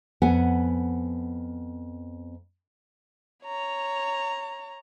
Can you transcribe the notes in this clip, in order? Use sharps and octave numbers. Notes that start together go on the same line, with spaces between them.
F2 B3 F#5 G#5
C#5 A#5